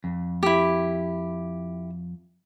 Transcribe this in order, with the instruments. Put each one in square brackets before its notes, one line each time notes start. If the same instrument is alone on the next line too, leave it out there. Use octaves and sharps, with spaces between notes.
[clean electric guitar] F2
[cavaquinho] E4 G4